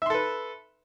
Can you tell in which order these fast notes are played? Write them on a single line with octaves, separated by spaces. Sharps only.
E5 C6 A4 B4